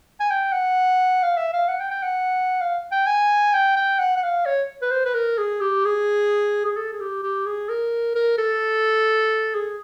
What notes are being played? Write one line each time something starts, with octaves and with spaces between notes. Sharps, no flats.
G#5
G5
F#5
F5
E5
F5
F#5
G5
G5
F#5
F5
G5
G#5
G5
G5
F#5
F#5
F5
C#5
B4
C5
B4
A#4
G#4
G4
G#4
G#4
A4
G#4
G4
G4
G#4
A#4
A#4
A4
G#4